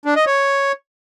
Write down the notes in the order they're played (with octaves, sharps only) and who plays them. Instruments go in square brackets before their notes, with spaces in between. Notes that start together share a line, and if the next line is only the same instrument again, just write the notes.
[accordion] D4
D#5
C#5